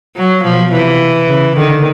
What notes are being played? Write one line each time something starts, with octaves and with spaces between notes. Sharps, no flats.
F#3
B2 F3
C3 E3
C#3
D3 D#3